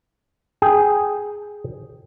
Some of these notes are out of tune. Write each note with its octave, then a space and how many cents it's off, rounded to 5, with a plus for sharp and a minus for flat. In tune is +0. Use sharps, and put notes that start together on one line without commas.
G#4 +0 G5 +0